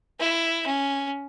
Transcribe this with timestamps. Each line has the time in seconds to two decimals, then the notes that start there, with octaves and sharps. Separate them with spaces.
0.20 E4
0.66 C#4